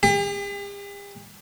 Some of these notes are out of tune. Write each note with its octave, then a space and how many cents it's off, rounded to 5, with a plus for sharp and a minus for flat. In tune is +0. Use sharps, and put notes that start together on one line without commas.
G4 +45